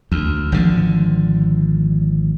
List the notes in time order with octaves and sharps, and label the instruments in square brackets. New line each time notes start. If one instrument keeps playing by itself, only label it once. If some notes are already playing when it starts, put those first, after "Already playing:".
[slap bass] D2
G#1 D3 F3